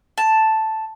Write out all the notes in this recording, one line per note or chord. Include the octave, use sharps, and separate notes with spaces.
A5